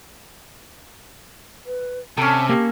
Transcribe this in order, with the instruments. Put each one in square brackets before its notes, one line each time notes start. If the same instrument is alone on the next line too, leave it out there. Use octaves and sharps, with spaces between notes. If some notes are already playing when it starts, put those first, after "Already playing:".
[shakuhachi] B4
[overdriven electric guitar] C3 [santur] C#4 A4 [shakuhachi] A5
[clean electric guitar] A#3 [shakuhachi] G4